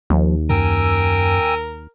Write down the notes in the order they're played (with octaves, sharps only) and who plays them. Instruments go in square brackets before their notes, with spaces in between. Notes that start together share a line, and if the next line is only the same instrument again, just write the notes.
[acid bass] D#2 [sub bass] F3
[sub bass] F#2 [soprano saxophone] A#4 [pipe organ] G5 G#5 E6